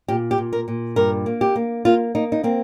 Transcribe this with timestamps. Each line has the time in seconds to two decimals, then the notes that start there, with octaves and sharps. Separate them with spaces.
0.08 A#2 G4
0.31 G4
0.38 A#2
0.53 A#4
0.68 A#2
0.96 G2 A#4
1.26 A#3
1.41 G4
1.56 A#3
1.85 A#3 F4
2.15 A#3 D#4
2.32 D#4
2.43 A#3 C4